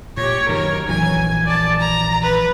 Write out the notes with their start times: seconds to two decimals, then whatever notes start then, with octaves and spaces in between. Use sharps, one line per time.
0.17 A#2 G4 C#5
0.49 F#2 D#3 A#4 C#5
0.89 A#1 E3 F#3 G#5
1.47 D5 A5
1.80 A#5
2.22 B4